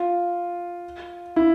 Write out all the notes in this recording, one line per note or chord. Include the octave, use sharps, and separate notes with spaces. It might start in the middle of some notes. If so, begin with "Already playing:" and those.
Already playing: F4
E4